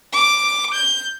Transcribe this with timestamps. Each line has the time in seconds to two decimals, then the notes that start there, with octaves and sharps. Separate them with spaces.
0.13 D6
0.75 G6